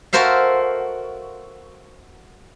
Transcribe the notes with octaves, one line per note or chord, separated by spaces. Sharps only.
F#4 A4 A#4 C5 E5 F5